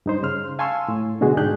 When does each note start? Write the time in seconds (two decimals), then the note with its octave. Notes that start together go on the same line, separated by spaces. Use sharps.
0.06 G2 D#4 C5
0.23 C#3 C6 F6
0.59 F5 G#5 A5 C6 C#6 E6
0.88 A2
1.21 B2 D3 G#3 F#4 G#4
1.37 G#2 D4 G4 G#4 F#6 G6